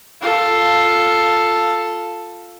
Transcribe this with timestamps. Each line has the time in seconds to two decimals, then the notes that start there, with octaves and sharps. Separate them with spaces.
0.22 F4 A4